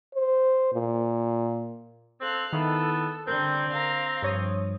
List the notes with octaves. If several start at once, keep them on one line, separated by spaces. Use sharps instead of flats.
C5
A#2
C4 A4 F5 F#6
D#3 B3 E4 A4
D3 G3 C4 A#4 G6
F5 A#5
G2 F3 C#5 D#6